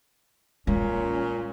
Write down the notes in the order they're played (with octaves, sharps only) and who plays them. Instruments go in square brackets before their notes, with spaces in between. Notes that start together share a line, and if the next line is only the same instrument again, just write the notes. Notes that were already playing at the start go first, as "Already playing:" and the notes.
[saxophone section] A#2 C#4 [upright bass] G#3